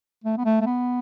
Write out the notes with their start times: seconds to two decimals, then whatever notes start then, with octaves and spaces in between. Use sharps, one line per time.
0.24 A3
0.38 B3
0.45 A3
0.61 A3
0.66 B3